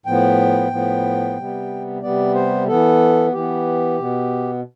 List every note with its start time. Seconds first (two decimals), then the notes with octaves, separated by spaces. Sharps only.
0.06 A2 F3 B3 G5
0.71 A2 F3 B3
1.37 C3 G3 B3
2.02 C3 G3 B3 D5
2.35 C5
2.68 E3 B3 A4
3.33 E3 B3 G4
3.98 B2 B3